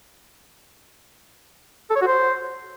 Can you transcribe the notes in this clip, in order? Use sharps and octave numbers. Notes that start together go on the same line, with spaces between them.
A4
C#5
F#4
C5